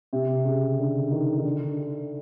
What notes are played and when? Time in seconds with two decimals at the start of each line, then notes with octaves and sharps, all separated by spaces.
0.13 C3
0.45 C#3
0.79 D3
1.11 D#3
1.38 D#3
1.45 D3